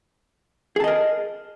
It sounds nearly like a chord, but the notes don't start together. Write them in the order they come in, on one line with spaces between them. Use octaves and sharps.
G#4 A5 D#5 A#4